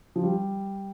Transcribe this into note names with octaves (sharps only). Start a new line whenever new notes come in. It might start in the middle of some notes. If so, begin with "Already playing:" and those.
F3
G3